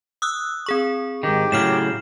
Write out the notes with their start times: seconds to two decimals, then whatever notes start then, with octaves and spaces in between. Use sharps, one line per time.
0.22 D#6 E6 F#6
0.66 C4 G#4 C#6
1.23 G#2 D#3 G4
1.52 A2 C#3 F#3 F6 C7 E7